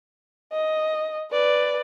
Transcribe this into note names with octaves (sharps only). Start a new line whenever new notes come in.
D#5
B4 D5